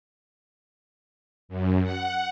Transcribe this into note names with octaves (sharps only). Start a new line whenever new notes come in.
F#2
F#5